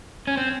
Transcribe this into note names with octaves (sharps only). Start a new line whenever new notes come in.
C#4
C4